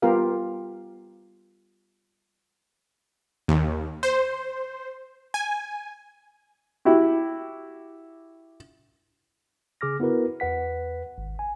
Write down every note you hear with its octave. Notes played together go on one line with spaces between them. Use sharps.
G3 B3 F4 G4 A#4 F5
D#2
C5
G#5
E4 F#4 G4
C#3 G#4 D6 F6 A#6
B3 E4 F#4 A#4 B4
E2 B4 F#5 B6
G#1
G#5